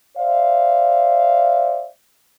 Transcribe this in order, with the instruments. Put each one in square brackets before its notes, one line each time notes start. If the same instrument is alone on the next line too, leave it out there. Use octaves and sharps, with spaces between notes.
[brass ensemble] C5 D5 E5 F5